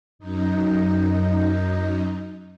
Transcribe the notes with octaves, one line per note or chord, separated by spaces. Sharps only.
F#2 D#4